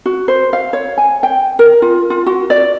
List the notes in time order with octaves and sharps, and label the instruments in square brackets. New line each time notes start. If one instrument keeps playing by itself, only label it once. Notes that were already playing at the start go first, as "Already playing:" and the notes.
[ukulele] F#4
C5
F5
C#5
G#5
G5
A#4
F4
F4
F#4
D5